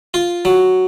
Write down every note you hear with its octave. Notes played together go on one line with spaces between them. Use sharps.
F4
F#3